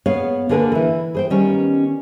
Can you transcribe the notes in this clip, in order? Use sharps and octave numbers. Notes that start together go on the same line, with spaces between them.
B3 G#4 C#5 F5
D3 A#3 G#4 A#4 B4 A5
E3 E4
G#4 C5 G5
D#3 G3 B3 C#4